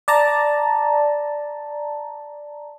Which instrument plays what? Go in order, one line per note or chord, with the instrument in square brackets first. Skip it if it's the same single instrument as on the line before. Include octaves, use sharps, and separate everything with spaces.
[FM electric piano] D5 A5 A#5